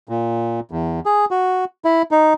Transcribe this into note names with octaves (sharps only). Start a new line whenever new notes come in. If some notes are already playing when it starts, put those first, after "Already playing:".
A#2
E2
G#4
F#4
E4
D#4